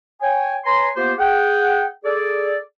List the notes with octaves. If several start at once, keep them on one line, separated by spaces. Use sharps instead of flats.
C#5 G5 G#5
B4 C#5 G#5 A#5 C6
A#3 B3 F4 G4 C5
G#4 F#5 G5
G#4 A4 D5